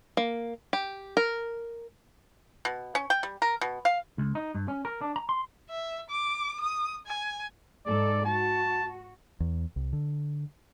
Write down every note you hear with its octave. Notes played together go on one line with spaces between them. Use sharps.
A#3
G4
A#4
B2
C#4
G5
G3
A#4
B2
F5
C#2
D#4
G2
C#4
A#4
D4
A#5
C6
E5
D6
D#6
G#5
G#2 A4 D5
F#4 A5
E2
C2
D3